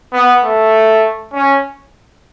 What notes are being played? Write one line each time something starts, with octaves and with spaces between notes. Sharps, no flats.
B3
A3
C#4